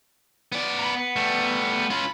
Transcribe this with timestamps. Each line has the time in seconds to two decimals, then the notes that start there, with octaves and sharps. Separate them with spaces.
0.52 B3 D5
0.79 A#5 B5
0.95 B3
1.16 G3 A3
1.90 C#4 F4 B5